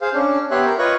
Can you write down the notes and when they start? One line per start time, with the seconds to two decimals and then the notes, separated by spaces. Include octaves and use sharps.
0.02 G#4 C5 F5
0.14 C#4 D4
0.51 B3 G4 C#5 E5 C6 F#6
0.65 A#4
0.79 F4 B4 C#5 D#5 C#6 F#6